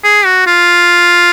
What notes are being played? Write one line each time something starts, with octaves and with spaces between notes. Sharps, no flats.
G#4
F#4
F4